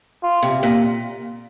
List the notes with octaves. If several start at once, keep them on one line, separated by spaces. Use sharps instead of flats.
F4
C3
A#2